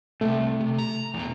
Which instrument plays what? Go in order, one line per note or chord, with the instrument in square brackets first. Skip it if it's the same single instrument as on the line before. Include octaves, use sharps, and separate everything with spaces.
[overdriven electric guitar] C2 C3 [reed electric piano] A3
[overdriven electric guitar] C3
A#5
E2 B2